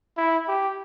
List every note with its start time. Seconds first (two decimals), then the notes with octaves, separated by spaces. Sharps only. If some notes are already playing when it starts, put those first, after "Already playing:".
0.17 E4
0.48 G4